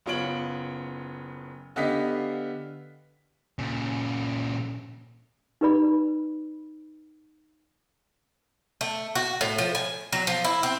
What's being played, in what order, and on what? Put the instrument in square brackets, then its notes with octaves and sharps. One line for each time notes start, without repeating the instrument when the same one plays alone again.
[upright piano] F#1 B3 F4 C#5 D7 F#7
D3 B3 G4 D#5 F5 B6
[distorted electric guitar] A#2 C#3
[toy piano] D#4 G4 B4 D5 B5
[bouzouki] A3
F#4
A2
F3
G#5
F#3
F3
E4
C4